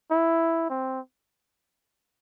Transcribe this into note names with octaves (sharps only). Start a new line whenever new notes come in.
E4
C4